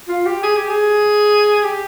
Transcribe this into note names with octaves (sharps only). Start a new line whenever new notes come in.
F4
G4
G#4
G4
G#4
G4